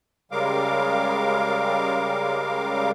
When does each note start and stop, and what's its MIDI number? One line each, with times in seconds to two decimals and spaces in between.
0.32 2.91 49
0.32 2.91 55
0.32 2.91 56
0.32 2.91 70
0.32 2.91 77
0.32 2.91 86